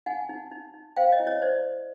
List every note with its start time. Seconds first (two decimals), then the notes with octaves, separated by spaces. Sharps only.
0.06 D#4 F#5 G#5
0.29 D#4
0.52 D#4
0.74 D#4
0.97 C5 F5 G5
1.12 C#5 D#5
1.20 E4
1.27 C#5 D#5
1.42 C5 D5